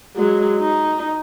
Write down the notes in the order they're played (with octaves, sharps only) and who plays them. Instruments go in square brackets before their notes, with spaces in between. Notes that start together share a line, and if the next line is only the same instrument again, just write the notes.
[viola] F#3 G#3
D#4